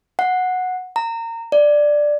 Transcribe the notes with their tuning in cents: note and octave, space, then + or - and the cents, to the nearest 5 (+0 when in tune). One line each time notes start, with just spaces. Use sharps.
F#5 -10
A#5 -25
D5 +5